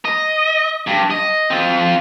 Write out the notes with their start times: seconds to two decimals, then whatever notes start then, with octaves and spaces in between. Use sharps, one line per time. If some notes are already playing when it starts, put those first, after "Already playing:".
0.05 D#5
0.87 G2
1.10 D#5
1.50 C4 F4